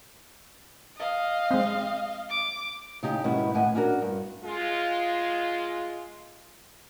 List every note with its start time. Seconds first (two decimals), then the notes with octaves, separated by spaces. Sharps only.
0.96 D#5 F5
1.51 G#3 C4
2.29 D6
3.03 C#3 D#4 G4
3.24 D#2 G#2 B2 B3 C#4 E4
3.54 A2 D#3 F#5 G#5
3.75 C#4 D4 F#4 A#4
4.02 G2
4.45 G#3 F4